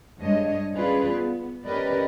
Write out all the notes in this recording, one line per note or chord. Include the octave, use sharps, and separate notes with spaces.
G2 G#3 D4 C#5 D#5
C#4 F4 G#4 B4 D5
B3
C#4 G4 A#4 B4 D5 D#5